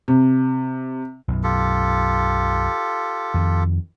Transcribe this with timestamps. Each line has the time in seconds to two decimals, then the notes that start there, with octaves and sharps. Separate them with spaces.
0.08 C3
1.28 B1 F#2
1.43 F4 G4 A4
3.34 F2 D#3